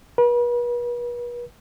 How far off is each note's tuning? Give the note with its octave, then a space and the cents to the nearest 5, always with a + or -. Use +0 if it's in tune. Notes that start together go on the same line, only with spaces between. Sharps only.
B4 -40